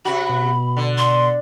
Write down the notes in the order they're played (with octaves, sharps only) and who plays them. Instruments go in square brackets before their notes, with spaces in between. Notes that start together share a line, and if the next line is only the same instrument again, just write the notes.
[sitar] C3 F#4 [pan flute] B5
[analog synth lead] B2
[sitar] D3
[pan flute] C6